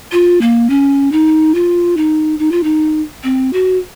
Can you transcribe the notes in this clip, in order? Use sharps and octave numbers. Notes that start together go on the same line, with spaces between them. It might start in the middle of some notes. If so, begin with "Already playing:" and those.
F4
A#3
C#4
D#4
F4
D#4
D#4
F4
D#4
C4
F#4